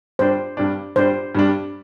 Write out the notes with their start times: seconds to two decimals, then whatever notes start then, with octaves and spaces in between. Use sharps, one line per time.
0.19 G2 G3 D4 C5
0.57 G2 G3 D4
0.96 G2 G3 D4 C5
1.35 G2 G3 D4